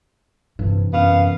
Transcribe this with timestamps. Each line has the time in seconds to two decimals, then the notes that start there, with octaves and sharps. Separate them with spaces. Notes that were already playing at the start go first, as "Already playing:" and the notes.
0.59 G2 C3 E3
0.93 F#2 B3 F5